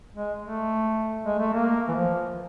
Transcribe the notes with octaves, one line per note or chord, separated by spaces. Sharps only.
G#3
A3
G#3
A3
A#3
E3
F3